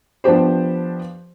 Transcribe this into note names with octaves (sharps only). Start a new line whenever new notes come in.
F3 B3 D4 G4 C5